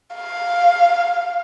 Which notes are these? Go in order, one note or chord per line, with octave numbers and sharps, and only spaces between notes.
F5